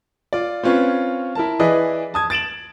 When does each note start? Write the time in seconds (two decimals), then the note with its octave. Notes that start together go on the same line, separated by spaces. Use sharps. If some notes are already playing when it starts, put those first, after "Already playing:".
0.33 F4 D5
0.63 C4 C#4 F4 B4 C#5
1.35 E4 A#4 A5
1.60 E3 E4 G#4 B4 D5 D#5
2.14 A5 D#6 G#6
2.30 A6 D7 E7 F#7